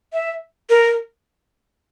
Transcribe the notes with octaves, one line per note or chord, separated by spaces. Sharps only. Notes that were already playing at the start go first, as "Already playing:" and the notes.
E5
A#4